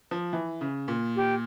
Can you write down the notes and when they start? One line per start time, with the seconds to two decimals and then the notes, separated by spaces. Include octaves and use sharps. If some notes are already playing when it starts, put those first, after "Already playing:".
0.11 F3
0.33 E3
0.61 C#3
0.88 A#2
1.16 G4